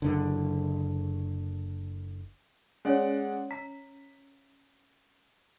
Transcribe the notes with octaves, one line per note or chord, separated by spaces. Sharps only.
F#1 D3
G#3 C#4 C#5 D5 F#5
A#5 B6